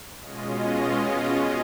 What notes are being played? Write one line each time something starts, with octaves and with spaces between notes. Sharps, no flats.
B2 G#3 C#4 F4 D#5